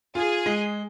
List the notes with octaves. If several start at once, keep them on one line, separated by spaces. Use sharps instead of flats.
F4 G#4
G#3